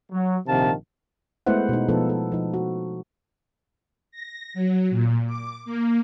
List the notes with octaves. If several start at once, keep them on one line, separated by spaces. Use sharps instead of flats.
F#3
A#1 C3 D#3 F5 A5
G#3 A3 B3 E4 C5 F#5
B2 D#4
B2 F3 B3 D#4 F4 A4
A4
F3 D#4
F#4
A#6
F#3
A#2
D6
A#3